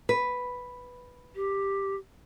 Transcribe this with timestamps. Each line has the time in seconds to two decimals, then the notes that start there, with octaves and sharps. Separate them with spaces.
0.09 B4
1.35 G4